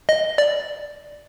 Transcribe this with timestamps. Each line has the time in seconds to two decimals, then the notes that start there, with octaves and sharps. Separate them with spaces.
0.09 D#5
0.38 D5